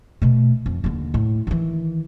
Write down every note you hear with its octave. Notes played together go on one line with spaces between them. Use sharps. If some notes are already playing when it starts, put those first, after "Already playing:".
B2 A3
F2
D#2 D3
A2
D#3 E3